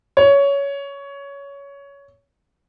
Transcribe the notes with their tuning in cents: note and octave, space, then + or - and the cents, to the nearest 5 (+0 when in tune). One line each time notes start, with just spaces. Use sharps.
C#5 +15